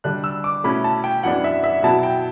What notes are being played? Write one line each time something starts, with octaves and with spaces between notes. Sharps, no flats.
D3 G3 D4 F#6
E6
D6
B2 A3 C#4 E4 B5
A5
G5
F#2 E3 B3 D4 F#5
E5
E5
B2 F#3 B3 E4 A5
G5